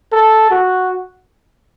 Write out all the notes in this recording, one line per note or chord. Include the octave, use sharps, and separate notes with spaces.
A4
F#4